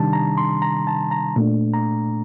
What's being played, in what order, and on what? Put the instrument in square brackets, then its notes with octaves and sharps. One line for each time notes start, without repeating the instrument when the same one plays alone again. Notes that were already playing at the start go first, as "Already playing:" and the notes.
Already playing: [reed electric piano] C3 D#3 G3 D4 A5
A#5
C6
A#5
A5
A#5
A#2 A3 D4
A#5